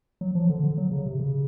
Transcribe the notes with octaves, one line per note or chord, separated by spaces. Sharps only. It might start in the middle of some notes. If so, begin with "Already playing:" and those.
F#3
F3
D3
D3
F#3
C#3
C3
C#3